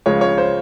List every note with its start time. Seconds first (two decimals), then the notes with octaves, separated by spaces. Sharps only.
0.06 C#2 C#3 F3 G#3 C#5
0.21 C#5
0.38 C5